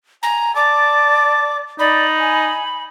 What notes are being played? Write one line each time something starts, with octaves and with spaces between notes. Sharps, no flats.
G#5 A#5
D5 A5 D6
D#4 D5 B5
G#5